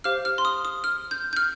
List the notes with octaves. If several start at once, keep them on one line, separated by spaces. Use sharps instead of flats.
G4 C5 F5 F6
F6
C6
D#6
D#6
F6
G6
G6
F6